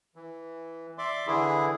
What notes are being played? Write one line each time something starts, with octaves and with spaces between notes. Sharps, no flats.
E3
D5 E5 C6 D6
D3 E3 E4 G#4